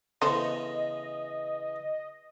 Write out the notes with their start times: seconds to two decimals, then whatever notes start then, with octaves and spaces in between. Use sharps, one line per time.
0.22 C#3 E3 B3 A4 C5 D#5